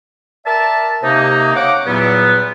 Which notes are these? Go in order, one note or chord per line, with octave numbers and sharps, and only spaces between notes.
A#4 D5 E5 A5
C3 A#3 D#4
C#4 F5 F#5 D6
E2 A#2 F#3 G3 B3